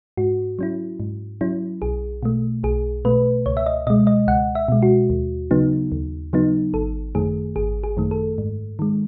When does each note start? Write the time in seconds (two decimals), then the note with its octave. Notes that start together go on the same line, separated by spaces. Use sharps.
0.17 G#2 F#4
0.59 F#3 C#4 E4
1.00 G#2
1.41 F#3 C#4 E4
1.82 B1 G#4
2.23 B2 A3
2.63 B1 G#4
3.05 B2 A3 B4
3.46 C#2 C#5
3.57 E5
3.66 D#5
3.87 B2 G#3 D#5
4.07 D#5
4.27 C#2 F#5
4.55 E5
4.68 B2 G#3
4.83 F#4
5.10 D#2
5.51 C#3 F#3 B3 D#4
5.92 D#2
6.33 C#3 F#3 B3 D#4
6.74 G#1 A4
7.15 F#2 D#3 A3 G#4
7.56 G#1 G#4
7.84 G#4
7.97 F#2 D#3 A3
8.11 A4
8.38 G#2
8.79 D#3 G#3